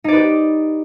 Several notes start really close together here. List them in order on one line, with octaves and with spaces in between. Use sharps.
D#4 D5 B4 G4